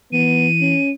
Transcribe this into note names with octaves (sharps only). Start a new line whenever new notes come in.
E3 B3 D#7
C#4